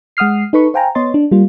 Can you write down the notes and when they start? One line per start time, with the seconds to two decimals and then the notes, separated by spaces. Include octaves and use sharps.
0.17 G#3 F#5 D#6 F6 C7
0.53 D#4 A4 B4 B5 C#6
0.74 C5 F5 G5 G#5 A#5
0.95 B3 C#5 D#5 C6 A6
1.14 D4
1.31 G3 A#3 F4